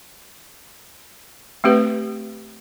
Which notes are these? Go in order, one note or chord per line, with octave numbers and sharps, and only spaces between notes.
A3 C4 G4 B4